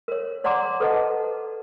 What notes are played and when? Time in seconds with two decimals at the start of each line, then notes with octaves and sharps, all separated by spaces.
0.08 A#4 C#5
0.44 C#5 D5 F#5 A#5 C6 D6
0.80 A4 B4 C5 D#5 F#5 A5